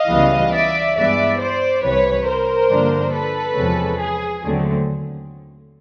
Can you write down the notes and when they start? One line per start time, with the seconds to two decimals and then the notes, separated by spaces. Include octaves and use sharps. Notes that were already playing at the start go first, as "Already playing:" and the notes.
Already playing: D#5 F5
0.09 C#2 C#3 E3 G3 B3
0.52 D5 E5
0.95 G2 E3 G#3 B3 D5 E5
1.38 C5 D5
1.82 C2 C3 E3 B4 C#5
2.25 A#4 C5
2.68 G2 D3 F3 A#3 D4
3.12 A4 B4
3.55 E2 C3 F3 G#3 C#4
3.98 G#4
4.42 D#2 D3 F#3 A3 C4